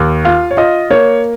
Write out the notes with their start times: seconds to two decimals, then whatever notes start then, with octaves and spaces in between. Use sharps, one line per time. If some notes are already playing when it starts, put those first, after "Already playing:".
Already playing: D#2
0.25 F4 F5
0.51 C#5
0.57 F4 D#5
0.90 A#3 C#5